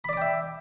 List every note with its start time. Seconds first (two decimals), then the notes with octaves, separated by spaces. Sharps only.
0.04 B5
0.09 D5
0.13 D6
0.17 G5
0.22 E5